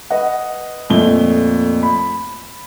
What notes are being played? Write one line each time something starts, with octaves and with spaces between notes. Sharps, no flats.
B4 D#5 F#5
F2 A#2 A3 G7
B5